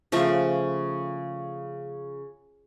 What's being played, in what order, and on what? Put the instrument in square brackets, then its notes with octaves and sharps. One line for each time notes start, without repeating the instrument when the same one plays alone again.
[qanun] C#3 F3 A3 C#6